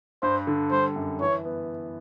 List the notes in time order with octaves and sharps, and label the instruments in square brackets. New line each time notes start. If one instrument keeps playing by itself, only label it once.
[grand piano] G2 [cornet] C5
[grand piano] D3
[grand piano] G3 [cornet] C5
[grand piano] F#2
[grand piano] E3 [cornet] C#5
[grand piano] B3